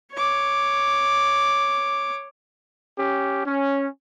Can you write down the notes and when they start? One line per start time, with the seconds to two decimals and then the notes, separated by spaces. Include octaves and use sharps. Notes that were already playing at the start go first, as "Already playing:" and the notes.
0.13 C#5 D6
2.98 C#4 G4
3.46 C#4